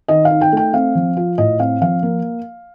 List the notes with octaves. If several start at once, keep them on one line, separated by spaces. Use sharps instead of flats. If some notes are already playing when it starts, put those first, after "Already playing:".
D#3 D#5
F5
D#4
G5
A3 G5
C4 F5
F3
F4
A2 D#5
C4 F5
F3 F5
A#3